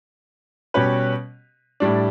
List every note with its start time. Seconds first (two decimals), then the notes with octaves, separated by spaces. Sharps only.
0.74 B2 G3 C#4 G4 B4
1.80 A2 G3 D4